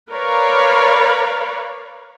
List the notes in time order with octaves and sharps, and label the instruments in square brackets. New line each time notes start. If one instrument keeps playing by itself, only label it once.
[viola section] A#4 B4 C#5 D5 F5 B5